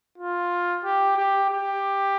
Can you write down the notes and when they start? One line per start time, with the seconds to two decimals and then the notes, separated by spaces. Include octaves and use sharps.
0.18 F4
0.84 G4
1.17 G4
1.50 G4